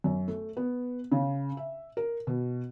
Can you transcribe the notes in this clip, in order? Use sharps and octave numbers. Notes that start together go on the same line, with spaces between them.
F#2
A3
B3
C#3
E5
A#4
B2